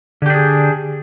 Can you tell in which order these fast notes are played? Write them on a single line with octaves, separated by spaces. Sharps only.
D3 G4 D4 G#4